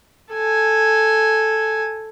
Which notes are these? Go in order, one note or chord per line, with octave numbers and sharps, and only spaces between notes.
A4 G#5